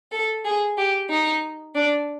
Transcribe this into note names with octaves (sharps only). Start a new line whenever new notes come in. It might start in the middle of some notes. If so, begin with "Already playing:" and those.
A4
G#4
G4
D#4
D4